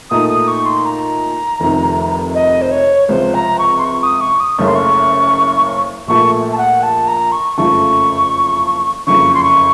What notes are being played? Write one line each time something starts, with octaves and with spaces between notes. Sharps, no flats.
A#2 A3 D#4 D#6
D#6
C#6
C6
A#5
F1 F2 C3 D#3
D#5
C5
C#5
C#2 C3 F3 C5
A#5
C#6
C6
C#6
D#6
C#6
D#6
F#1 F#2 C#3 A3 C#4 C#6
C6
C#6
A#1 A#2 A3 C#6
A5
F#5
A5
A#5
C#6
F#1 F2 C#3 F3 A3 C#6
F#1 F2 C#3 C#6
C6
C#6